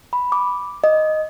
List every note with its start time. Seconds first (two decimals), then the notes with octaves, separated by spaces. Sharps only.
0.13 B5
0.32 D6
0.84 D#5